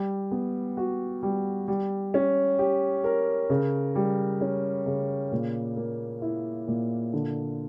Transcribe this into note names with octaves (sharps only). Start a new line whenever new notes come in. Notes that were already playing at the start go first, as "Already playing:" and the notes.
Already playing: G3
B3
F#4
G3
G3
C#4
G4
A#4
C#3
G3
C#4
C#3
A#2
A#3
E4
A#2
D3